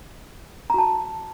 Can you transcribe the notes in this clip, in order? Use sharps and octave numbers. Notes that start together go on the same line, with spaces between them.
F#4 A5 A#5